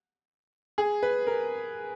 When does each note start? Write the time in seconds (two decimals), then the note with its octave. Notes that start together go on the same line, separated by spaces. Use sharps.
0.78 G#4
1.03 B4
1.27 A#4